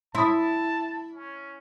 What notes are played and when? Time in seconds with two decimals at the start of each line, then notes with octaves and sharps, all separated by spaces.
0.15 E4 A5 C6 D#6
1.13 C#4